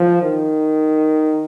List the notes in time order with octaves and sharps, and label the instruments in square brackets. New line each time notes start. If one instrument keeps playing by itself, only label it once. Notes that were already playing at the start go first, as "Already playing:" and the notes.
Already playing: [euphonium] F3
D#3